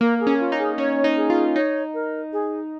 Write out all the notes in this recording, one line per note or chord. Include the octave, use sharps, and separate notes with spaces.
A#3 A#4
G#4
C#4
F4
D#4
G#4
C#4 C#5
D#4
G#4
F4
D#4 C#5
A#4
G#4